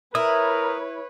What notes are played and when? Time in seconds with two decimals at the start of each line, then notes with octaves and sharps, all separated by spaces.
0.15 E4 A#4 B4 C#5 D#6